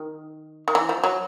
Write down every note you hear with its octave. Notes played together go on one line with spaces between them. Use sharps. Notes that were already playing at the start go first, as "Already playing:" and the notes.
Already playing: D#3
D#3
E3
F3
F#3